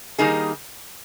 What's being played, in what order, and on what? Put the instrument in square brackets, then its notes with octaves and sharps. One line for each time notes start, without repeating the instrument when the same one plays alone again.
[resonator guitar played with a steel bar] D#3 G3 A#3 D#4 G#4